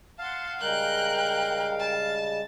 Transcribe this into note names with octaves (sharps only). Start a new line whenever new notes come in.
F5 F#5 A5 C6
C#3 G3 G#3 A#4 G5 A#5 F#6 G6
A5